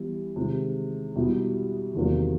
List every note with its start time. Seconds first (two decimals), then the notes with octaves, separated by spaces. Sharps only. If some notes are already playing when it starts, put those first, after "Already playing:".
Already playing: E3 G3 B3 E4
0.36 C3 D#3 G#3
1.15 B2 G3 B3 E4 G4
1.94 E2 C3 D#3 F#3 A#3